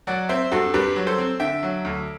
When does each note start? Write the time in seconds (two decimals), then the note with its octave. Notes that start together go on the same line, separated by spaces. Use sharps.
0.07 F#3 D5 F#5
0.29 C4 C5 E5
0.52 G2 F#4 A4
0.74 G2 G4 B4
0.96 F#3
1.07 A4 C5
1.18 C4
1.40 D3 E5 G5
1.63 F#3
1.85 D2